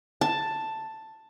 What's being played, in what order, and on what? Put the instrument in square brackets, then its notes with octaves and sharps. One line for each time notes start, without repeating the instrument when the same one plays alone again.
[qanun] A5